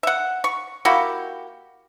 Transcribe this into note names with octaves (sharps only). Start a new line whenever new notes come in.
E5 F#5
C#6
A#3 E4 F#4 G4